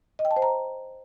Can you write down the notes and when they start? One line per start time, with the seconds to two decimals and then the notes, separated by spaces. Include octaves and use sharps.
0.19 D#5
0.25 G5
0.31 A5
0.36 C5
0.42 A#5